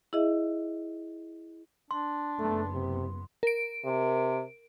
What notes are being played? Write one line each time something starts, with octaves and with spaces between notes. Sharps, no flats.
E4 G#4 D#5 E5
D4 C6
F#1 A3 B3
C3
A#4 D7
C3